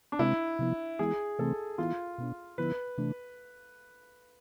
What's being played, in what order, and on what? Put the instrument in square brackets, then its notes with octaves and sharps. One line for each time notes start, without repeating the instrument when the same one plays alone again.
[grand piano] D4
[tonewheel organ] C3 G#3 C4 [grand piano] E4
[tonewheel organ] C3 F3 B3 E4
[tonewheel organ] E3 G#3 B3 E4 [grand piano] G#4
[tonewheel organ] C3 E3 A3 C4 [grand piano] A4
[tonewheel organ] E3 B3 E4 [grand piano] F4
[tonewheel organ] B2 B3 D4
[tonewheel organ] D3 F3 B3 E4 [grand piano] B4
[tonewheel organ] C3 E3 A3 D4